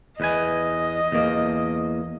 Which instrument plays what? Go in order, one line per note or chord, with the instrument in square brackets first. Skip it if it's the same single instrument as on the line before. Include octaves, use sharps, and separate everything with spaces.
[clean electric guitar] E2 B4 G#5 [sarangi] D#5
[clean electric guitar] E2 A#3